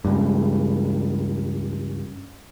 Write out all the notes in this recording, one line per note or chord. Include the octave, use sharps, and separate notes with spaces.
C#2 G2